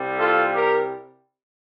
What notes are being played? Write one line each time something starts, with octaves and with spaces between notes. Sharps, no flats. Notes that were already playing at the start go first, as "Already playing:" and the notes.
Already playing: C2 C3 G3
F4 A4
G4 A#4